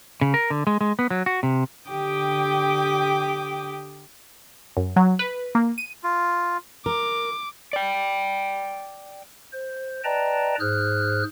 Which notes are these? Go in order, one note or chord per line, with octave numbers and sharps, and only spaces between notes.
C#3
A#4
D3
G#3
G#3
B3
F#3
F#4
C3
D3 G4 G5 D6 D#6
F#2
F#3
B4
A#3
D#7
F4
A#4 D6
D5 G5
C5
B4 D5 D#5 G5 A5 A#5
G#2 G#4 C5 F6 F#6